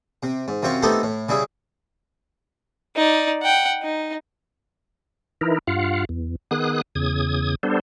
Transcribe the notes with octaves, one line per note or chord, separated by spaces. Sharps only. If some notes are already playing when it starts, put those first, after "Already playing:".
C3
G#2
F#2 C3 C4 F4 C#6
A3 B3 C4 D#4 G4 A4
A2
C#3 G3 E4 G#4
D#4 D5
F#5 G5
D#4
E3 D#4 E4 A#4
G2 F4 F5 F#5
E2
D#3 B3 G#4 D#6 F#6
E2 C#3 D#6 G#6
G3 B3 D4 A4 C5